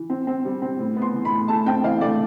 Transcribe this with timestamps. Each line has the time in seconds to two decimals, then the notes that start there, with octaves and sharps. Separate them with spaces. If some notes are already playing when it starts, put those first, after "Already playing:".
Already playing: E3
0.10 C4
0.27 C4
0.45 G3
0.62 C4
0.79 A2
0.96 B3
1.02 C6
1.14 E3
1.25 B5
1.31 A2
1.48 A3 A5
1.66 C4 G5
1.84 E3 F5
2.01 A3 D5